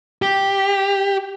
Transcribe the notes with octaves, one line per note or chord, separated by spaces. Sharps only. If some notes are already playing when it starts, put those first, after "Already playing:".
G4